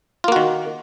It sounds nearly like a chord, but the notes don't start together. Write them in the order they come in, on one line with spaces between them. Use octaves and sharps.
F4 A#3 F#4 D#3